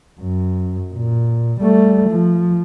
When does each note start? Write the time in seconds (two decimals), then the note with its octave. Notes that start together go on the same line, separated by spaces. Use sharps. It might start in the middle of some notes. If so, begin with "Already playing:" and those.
0.20 F#2
0.94 A#2
1.60 G3 A3
2.10 F3